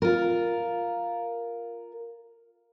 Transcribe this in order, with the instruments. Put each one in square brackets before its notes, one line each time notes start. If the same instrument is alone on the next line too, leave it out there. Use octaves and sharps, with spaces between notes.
[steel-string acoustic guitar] F4 A#4